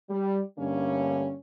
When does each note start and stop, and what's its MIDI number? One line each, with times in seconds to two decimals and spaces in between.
0.10 0.41 55
0.58 1.35 43
0.58 1.35 50
0.58 1.35 55
0.58 1.35 57
0.58 1.35 58
0.58 1.35 61